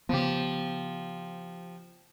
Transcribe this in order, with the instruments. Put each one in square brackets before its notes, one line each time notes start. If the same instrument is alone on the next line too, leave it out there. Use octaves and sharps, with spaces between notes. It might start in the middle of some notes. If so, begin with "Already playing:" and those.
[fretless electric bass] C#3 B3 [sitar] F3 G4